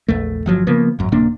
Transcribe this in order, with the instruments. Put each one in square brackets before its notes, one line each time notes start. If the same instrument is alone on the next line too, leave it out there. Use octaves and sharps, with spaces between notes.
[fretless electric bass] A#1 E2 A3
G1 F3 F#3
C#3 F3 A#3 B3
G#1 F#2
D1 C3 A#3 D4